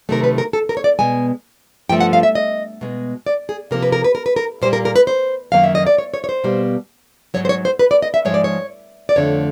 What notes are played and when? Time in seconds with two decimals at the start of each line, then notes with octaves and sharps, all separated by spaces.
0.09 C3 D#3 F#3 A3 A#4
0.24 B4
0.38 A#4
0.53 A4
0.69 A#4
0.77 C#5
0.84 D5
0.99 B2 G#3 G#5
1.89 G2 D3 F3 A3 G5
2.00 F#5
2.13 F5
2.23 E5
2.35 D#5
2.81 B2 G#3
3.26 D5
3.49 G#4
3.71 C3 F3 A#3 A#4
3.82 B4
3.92 A#4
4.04 B4
4.15 A#4
4.26 B4
4.36 A#4
4.62 A#2 G3 A#3 C5
4.73 A#4
4.85 A#4
4.96 B4
5.07 C5
5.52 F#2 D#3 F#3 A#3 F5
5.64 E5
5.75 D#5
5.86 D5
5.98 C#5
6.14 C#5
6.24 C#5
6.29 C5
6.44 B2 G3 A#3
7.34 G#2 D#3 F#3 C#5
7.45 C5
7.49 C#5
7.65 C5
7.79 B4
7.91 D5
8.02 D#5
8.14 E5
8.25 G#2 F3 G#3 C#5
8.34 D5
8.44 C#5
9.09 D5
9.16 F2 D3 F3 A3 C#5